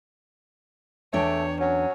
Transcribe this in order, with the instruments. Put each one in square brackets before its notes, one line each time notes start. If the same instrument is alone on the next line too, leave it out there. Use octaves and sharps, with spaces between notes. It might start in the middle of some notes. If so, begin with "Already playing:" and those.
[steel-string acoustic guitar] E2 D4 G5 [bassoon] A3 [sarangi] C#5
[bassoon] F#3 [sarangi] C#4